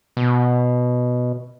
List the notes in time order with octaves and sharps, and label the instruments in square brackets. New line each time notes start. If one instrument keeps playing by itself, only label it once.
[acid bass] B2